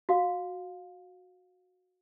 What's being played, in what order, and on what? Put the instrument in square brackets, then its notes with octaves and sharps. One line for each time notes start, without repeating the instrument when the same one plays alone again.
[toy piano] F#4 F5